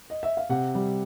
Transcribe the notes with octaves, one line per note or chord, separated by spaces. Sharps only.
D#5
E5
F5
C3 F#5
G3